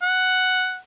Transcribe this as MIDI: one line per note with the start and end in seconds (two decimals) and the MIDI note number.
0.02 0.77 78